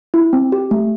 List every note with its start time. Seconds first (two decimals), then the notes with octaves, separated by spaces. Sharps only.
0.14 E4
0.33 C4
0.52 G4
0.71 A3